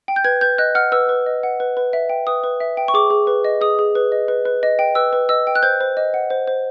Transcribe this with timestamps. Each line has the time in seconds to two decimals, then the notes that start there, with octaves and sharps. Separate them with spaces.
0.08 G5
0.16 G6
0.25 B4 G#6
0.41 B4 G6
0.58 D#5 F#6
0.75 F#5 F6
0.92 B4 E6
1.09 B4
1.26 D#5
1.43 F#5
1.60 B4
1.77 B4
1.93 E5
2.09 G5
2.27 B4 D#6
2.44 B4
2.60 E5
2.77 G5
2.88 C#6
2.94 G#4 D6
3.10 G#4
3.27 B4
3.44 D#5
3.61 G#4 D#6
3.79 G#4
3.95 B4
4.12 D#5
4.28 B4
4.46 B4
4.63 D#5
4.79 G5
4.95 B4 E6
5.13 B4
5.29 D#5 E6
5.47 G5
5.55 F#6
5.63 C5 G6
5.81 C5
5.97 D#5
6.14 F#5
6.30 C5
6.47 C5